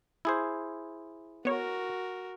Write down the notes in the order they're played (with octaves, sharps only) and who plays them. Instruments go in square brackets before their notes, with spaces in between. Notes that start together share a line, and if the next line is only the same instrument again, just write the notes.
[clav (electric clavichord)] E4 G#4 C5
[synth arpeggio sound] B3 C#5 [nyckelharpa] F#4 A#4